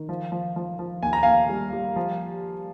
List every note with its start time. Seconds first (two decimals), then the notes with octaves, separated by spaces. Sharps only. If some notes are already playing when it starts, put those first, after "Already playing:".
Already playing: D#3
0.09 F3
0.32 F3
0.56 F3
0.79 F3
1.02 D#2 G#5
1.13 A#5
1.23 D#2 F5 G#5
1.49 G3
1.73 G3
1.96 F3